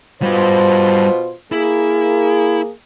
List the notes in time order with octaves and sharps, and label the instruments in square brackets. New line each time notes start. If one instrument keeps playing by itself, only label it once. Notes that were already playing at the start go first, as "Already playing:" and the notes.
[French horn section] B2 F4 C5 [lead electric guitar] G3 B4
[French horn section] A#3 G#4 [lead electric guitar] E4